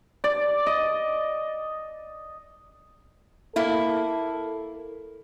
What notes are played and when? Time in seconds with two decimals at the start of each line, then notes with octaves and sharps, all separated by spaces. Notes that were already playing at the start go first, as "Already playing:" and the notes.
0.24 D5
0.67 D#5
3.56 A#3 E4 A4